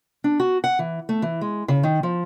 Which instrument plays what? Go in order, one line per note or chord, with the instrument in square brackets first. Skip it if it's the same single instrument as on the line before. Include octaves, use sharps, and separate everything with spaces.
[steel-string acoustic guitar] D4
F#4
F#5
E3
A3
E3
G#3
C#3
D#3
F3